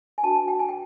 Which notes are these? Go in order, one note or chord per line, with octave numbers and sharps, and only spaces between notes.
G#5
D4 F#4 B4 A5
G#5
G5
G#5
G5